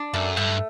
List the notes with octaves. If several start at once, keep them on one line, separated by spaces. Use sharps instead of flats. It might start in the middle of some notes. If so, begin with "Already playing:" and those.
Already playing: D4
F#2 A3
G2 A3